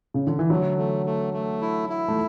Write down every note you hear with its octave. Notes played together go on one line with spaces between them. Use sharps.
C#3
D3
E3
D3 F#3 A3
A3
A3
A3
E4
E4
A3